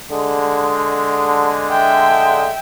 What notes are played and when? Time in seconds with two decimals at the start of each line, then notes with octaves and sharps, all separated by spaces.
0.11 D3 G#3
1.71 E5 G5